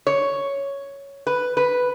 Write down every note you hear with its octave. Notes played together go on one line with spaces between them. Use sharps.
C#5
B4
B4